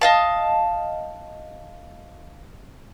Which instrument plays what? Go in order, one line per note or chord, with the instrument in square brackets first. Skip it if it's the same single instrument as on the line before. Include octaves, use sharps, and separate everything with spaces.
[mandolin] D#5 F5 A5